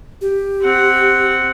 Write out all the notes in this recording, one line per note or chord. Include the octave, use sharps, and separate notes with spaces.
G4
C4 F#5